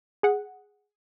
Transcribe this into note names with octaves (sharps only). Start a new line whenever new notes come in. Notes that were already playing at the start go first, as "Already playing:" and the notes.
G#4 F#5